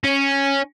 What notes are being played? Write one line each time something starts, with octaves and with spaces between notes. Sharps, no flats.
C#4